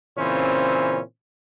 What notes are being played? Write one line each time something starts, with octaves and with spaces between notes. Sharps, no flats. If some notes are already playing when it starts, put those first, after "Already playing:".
A#2 C#3 E3 C4 C#4 C5